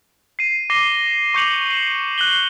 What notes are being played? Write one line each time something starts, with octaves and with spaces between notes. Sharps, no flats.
C7 D#7
D6 A#6 C7 G7
C#6 D6 G6 C#7 F7 F#7
C7 D#7 E7
F#6 C7 F#7 G7